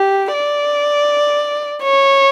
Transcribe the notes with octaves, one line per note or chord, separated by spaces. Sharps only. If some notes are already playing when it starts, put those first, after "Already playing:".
Already playing: G4
D5
C#5